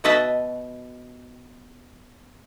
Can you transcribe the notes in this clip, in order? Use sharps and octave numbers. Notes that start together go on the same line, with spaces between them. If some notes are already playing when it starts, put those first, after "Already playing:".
B2 F#4 B4 D#5 E5 A5